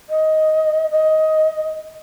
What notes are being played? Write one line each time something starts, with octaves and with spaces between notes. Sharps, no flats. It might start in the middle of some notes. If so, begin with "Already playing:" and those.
D#5
D#5